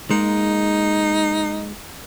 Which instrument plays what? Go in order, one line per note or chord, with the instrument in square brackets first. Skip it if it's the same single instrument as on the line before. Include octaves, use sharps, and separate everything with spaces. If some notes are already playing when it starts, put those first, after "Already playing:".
[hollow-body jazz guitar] G#3 A#3 [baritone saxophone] D#4